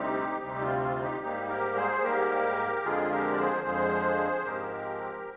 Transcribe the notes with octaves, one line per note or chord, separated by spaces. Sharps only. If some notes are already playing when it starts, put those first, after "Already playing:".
Already playing: D2 C3 G3 C4 D#4 G4
D2 C3 G3 C4 D#4 G4
F4
F4
D#4 G4
G#2 G3 A#3 D#4 G4
G4 A#4
G#4 C5
G#2 G3 A#3 G4 A#4
F2 D3 F3 G#3 F4 G#4
G4 A#4
D5
G#4 C5
F2 D3 F3 G#3 G#4 C5
G#2 F3 G#3 C4 G4 A#4